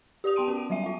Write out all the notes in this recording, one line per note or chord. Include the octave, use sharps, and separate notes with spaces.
G4 D5 D#6 F7
B3 G5 A5 C6 D7 D#7
C#4 F#4
F#3 G3 F4 E5 D#7
F4 E5